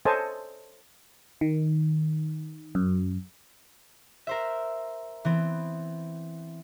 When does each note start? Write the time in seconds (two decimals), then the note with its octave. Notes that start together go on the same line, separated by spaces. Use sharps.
0.05 A4 C5 C#5 D#5 G#5 A5
1.41 D#3
2.75 F#2
4.27 A#4 C5 E5
5.25 E3 B3 C4